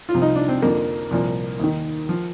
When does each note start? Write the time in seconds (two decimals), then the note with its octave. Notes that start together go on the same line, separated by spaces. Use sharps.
0.09 F4
0.14 C2 C3 F3
0.22 D#4
0.35 D4
0.48 C4
0.62 F2 D3 F3 A#3
1.11 C2 A#2 F3
1.60 D#2 D#3
2.09 F3